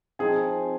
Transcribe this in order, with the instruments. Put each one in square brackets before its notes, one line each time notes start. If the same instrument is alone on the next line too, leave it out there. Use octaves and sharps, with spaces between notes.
[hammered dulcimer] F3 C4 D#4 [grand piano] G#4 G#5